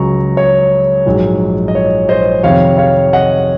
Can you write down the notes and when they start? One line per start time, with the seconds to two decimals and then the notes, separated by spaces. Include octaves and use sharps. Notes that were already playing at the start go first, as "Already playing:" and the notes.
Already playing: C#2 C#3 F#3 A#5 C#6
0.37 C#5
1.06 A#1 G#2 F#3
1.68 D#5
1.75 C#5
2.09 C5 D#5
2.43 F2 C3 D#3 C#5 F5
2.78 C#5 F5
3.13 D#5 F#5